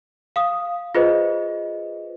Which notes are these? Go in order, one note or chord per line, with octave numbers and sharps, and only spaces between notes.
F5 D#6
F4 G#4 B4 C5 D#5